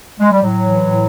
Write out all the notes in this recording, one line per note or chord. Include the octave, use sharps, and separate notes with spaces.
G#3
G3
A2 F#3
E3
A2